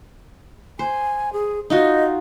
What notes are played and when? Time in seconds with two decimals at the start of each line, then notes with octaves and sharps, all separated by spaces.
0.79 C5 G#5
1.33 G#4
1.70 D#4 F4 F#4 D#5